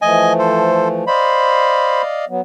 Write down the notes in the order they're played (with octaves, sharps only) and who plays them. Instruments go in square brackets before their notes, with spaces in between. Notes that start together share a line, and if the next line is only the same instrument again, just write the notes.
[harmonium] E3 F3 A3 [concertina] D#5 G#5
[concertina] A4 C5
[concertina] C5 B5 [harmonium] D5 D#5 F5
[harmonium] F#3 B3